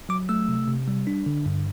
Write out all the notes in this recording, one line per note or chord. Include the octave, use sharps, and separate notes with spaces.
F#3 D6
A3 E6
C3
C3
G3
D4
D3
G2